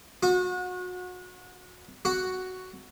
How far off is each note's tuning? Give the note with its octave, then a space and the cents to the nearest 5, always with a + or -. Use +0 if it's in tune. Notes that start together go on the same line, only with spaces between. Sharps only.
F#4 -30
F#4 +5